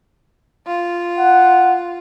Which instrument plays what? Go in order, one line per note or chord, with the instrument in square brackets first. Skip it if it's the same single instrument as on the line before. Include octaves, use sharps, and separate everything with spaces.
[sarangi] F4
[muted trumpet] F#5